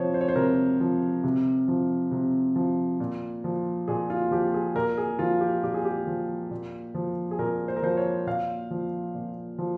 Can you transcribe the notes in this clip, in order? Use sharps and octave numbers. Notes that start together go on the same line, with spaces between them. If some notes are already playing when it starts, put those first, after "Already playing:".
Already playing: C3 F3 C5 C#5
C5
C#5
C5
C3 A#4
F3
C3
F3
C3
F3
A#2
F3
A#2 G#4
F4
F3 G4
G#4
A#2 A#4
G#4
F3 F4
G4
A#2 G4
G#4
G4
F3
A#2
F3
G#4
A#2 A#4
C5
A#4
F3 C5
C#5
A#2 F5
F3
A#2
F3